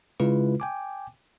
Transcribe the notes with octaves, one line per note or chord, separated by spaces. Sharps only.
C#3 G#3 E4 F4 B4
G5 G#5 D6